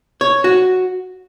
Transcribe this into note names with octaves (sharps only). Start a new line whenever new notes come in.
C#5
F#4